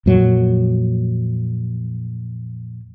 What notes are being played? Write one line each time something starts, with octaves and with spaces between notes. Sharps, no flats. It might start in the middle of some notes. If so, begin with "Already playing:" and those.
F2 A#2 F#3